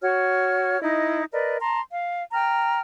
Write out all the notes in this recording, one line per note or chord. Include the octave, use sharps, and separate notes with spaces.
F#4 C#5 F6
D#4 E4 D#5
A#4 B4 D5 D#5
A5 A#5 C6
F5
G5 A#5 F6